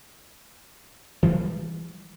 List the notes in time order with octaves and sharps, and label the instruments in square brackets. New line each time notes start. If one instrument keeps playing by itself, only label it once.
[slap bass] E3 F3 G3 G#3